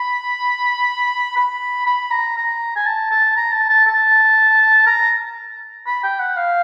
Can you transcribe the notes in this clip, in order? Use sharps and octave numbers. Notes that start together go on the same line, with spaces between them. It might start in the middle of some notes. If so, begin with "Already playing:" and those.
Already playing: B5
B5
B5
A#5
A#5
G#5
A5
A5
A#5
A5
A5
A5
A#5
B5
G5
F#5
F5